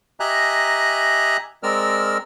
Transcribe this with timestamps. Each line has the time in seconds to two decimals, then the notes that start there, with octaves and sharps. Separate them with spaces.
0.20 G4 D#5 E5 G#5 A#5 F#6
1.63 G#3 C4 A#4 D5 E6 F6